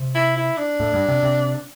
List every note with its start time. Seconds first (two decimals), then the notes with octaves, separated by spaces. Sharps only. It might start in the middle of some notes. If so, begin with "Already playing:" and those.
Already playing: C3
0.15 E4
0.37 E4
0.57 D4
0.80 A2
0.94 G2
1.08 C3
1.23 C3